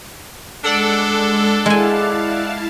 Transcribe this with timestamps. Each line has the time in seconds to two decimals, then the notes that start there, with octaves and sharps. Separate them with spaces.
0.64 G#3 D4 A4 D5 F#5 E6
1.66 G#3 E4 F5 G#5 A5